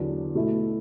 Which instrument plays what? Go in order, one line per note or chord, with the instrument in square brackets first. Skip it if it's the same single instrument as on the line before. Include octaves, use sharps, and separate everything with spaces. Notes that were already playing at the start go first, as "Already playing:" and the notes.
Already playing: [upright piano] E2 D3 F#3 D4
B2 A3 E4